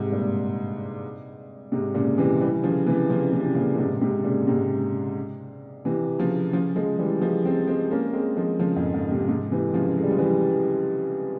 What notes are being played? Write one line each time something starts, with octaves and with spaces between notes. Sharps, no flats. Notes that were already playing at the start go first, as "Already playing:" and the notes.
Already playing: G#2 C3
G2 A#2
G#2 C3
A#2 C#3
C3 E3
E3 G3
C#3 F3
C3 E3
C#3 F3
C3 E3
C3
A#2 C#3
A#2
G#2 C3
G#2 C3
A#2 C#3
G#2 C3
C3 E3
C#3 F3
C#3 F3
F3 G#3
E3 G3
F3 G#3
G#3 C4
G#3 C4
A#3 C#4
G#3 C4
F3 G#3
C#3 F3
F2 G#2
F2 G#2
G#2 C3
G#2 C3
C3 E3
C#3 F3
G#3
G3
F3
E3 G3